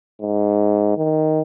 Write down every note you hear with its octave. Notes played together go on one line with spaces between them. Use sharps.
G#2
D#3